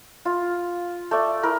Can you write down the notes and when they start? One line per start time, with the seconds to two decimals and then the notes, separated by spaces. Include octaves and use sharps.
0.25 F4
1.11 A3 D5
1.43 E4 A#4